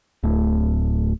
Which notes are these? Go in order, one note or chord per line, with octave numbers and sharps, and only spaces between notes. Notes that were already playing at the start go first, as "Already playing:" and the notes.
D1 A2